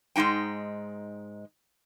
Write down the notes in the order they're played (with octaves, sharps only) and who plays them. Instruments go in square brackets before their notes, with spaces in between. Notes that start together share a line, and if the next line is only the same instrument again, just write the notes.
[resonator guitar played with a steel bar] G#2 G#3 A#3 D#4 G5